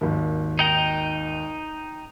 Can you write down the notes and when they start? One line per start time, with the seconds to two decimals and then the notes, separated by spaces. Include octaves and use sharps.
0.01 G#1 D#2
0.59 D#4 G5 A#5